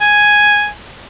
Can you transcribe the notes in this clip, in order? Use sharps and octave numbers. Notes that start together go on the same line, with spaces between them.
G#5